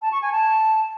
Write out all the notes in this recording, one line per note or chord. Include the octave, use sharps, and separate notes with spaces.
A5
C#6
G#5
A5